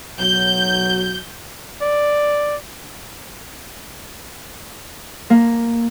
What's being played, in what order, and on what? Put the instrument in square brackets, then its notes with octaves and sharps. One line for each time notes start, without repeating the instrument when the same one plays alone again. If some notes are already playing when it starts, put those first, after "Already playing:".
[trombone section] B1 F#3 [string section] G6
[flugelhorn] D5
[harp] A#3